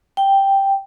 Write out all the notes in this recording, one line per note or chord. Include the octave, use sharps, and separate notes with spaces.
G5